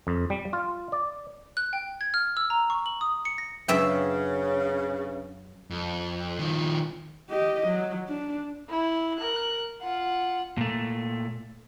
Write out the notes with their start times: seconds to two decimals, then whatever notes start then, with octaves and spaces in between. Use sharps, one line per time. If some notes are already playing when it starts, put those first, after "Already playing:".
0.07 F2
0.30 G3
0.53 F4
0.92 D5
1.57 F#6
1.73 G5
2.01 G#6
2.14 F6
2.37 E6
2.50 A#5
2.70 C#6
2.86 F#7
3.01 D#6
3.25 C#7
3.38 A#6
3.68 F#2 C#3 D4 B4 E5 G5 C#6
5.70 F2
6.39 D#3 F3
7.30 G4 D#5
7.67 F#3
8.08 D4
8.69 E4
9.18 A#4 F#6
9.81 F4 F#5
10.58 A#2 A3